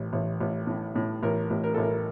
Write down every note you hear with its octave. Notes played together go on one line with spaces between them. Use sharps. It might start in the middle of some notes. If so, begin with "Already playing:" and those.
Already playing: A1
A1
A1
A2
A2
A1 A#4
A1
A#4
A1 A4
A#4